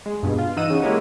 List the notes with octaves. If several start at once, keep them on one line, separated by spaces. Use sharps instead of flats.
G#3
G2 B2
F4
E3 D#4 D#5 F#5 E6 D#7
C#3 F#4
G#3 A#3 E4 G4 A#4 C#5